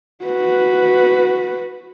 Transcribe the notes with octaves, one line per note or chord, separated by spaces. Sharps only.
F#4 B4